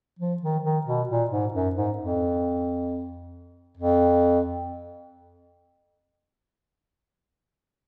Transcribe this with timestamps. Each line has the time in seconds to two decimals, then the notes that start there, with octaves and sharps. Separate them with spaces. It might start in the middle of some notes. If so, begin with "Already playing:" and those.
0.19 F3
0.42 D#3
0.63 D#3
0.87 B2
1.09 A#2
1.31 G#2
1.54 F#2
1.75 G#2
1.98 F2
3.77 F2